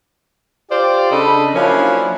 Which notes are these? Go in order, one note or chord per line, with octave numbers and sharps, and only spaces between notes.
F4 G4 C5 D5
C#3 D4 A4 D#5 B5
F3 F#3 A#3 C#4 D4 E4